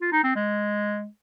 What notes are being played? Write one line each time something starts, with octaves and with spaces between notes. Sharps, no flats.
F4
D#4
C4
G#3